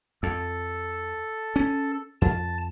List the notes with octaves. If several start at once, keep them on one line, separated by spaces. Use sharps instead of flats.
F2 A4
C#4
F2 A5